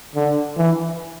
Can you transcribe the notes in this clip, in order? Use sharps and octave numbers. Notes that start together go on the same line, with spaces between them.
D3
E3